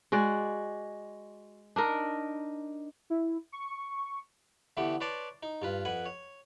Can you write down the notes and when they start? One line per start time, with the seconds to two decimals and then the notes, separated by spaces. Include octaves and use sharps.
0.12 G#3 F#4 D5
1.76 D4 D#4 A#4
3.10 E4
3.52 C#6
4.77 D3 E3 A3 B3 G4
5.01 B4 C#5 D5 A5 C6 C#6
5.43 D#4
5.62 G2 F4 B4
5.85 F2 B4 F#5 G#5
6.06 C#5